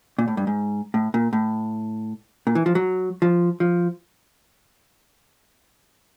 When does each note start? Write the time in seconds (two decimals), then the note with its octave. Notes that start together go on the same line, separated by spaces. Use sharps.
0.18 A#2
0.28 A2
0.37 G2
0.47 G#2
0.94 A2
1.14 A#2
1.33 A2
2.47 A#2
2.55 E3
2.66 F3
2.75 F#3
3.22 F3
3.60 F3